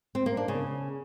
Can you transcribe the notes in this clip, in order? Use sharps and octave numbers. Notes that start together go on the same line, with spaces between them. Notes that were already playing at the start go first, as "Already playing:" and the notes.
C4
A#3
D4
C#3